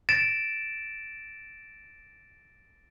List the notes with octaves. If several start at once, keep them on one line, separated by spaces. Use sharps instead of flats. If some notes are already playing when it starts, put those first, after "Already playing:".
A6 A#6 D7 E7